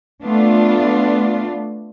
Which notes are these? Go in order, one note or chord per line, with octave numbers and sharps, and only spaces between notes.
A3 B3 D4 F4